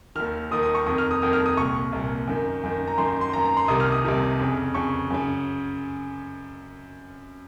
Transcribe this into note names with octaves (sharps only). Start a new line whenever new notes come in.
D#2 D#3 F6
D#2 D#3 D#6
D#6
C#6
F2 D#3 D#6
F6
D#6
F2 D#3 D#6
F6
D#6
C2 A#2 C#6
C2 A#2
F#2 D#3
F#2 D#3
A#5
F#2 D#3 C6
C6
F#2 D#3 A#5
A#5
C6
C2 C3 D#3 D#6
F6
D#6
C2 C3 D#3
F2 C#3
F2 C#3 C#6
F#2 C#3